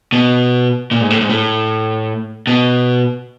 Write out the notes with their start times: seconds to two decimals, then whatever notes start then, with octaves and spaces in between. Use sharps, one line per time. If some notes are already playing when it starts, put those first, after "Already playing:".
0.12 B2
0.91 A#2
1.01 G#2
1.10 A2
1.20 G#2
1.30 A2
2.47 B2